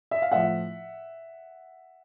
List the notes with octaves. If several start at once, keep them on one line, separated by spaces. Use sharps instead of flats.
E5
F5
A2 F3 E5 F#5